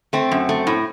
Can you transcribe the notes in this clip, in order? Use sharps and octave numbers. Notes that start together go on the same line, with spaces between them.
A3 C4
F#2
A3
A2